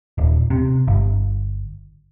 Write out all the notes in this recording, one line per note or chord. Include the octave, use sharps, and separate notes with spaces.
D#1
C3
G1